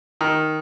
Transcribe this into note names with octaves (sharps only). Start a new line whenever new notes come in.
D#3